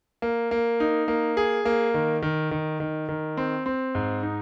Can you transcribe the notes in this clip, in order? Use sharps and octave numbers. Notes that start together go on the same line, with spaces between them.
A#3
A#3
D#4
A#3
G#4
A#3
D#3
D#3
D#3
D#3
D#3
C4
C4
G#2
D#4